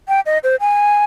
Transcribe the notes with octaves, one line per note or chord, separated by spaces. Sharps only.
G5
D#5
C5
G#5